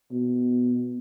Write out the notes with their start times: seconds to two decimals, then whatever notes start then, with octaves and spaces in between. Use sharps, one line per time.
0.12 B2